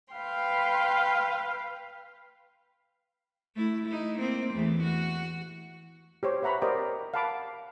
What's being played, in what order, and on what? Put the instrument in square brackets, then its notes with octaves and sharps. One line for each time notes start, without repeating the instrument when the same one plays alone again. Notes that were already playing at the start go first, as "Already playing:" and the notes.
[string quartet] B4 F5 G5 C6
[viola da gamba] A3 E4
D#4 E4
A#3 C4
E2 E3 A3
F#4
[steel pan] G4 C5 C#5
B4 E5 F#5 A#5 B5 C#6
G4 A#4 C5 D5 D#5 G5
F5 F#5 A5 B5 D6